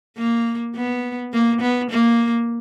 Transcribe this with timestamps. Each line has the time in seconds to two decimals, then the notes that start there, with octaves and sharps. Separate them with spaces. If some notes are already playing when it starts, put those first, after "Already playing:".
0.18 A#3
0.76 B3
1.33 A#3
1.61 B3
1.91 A#3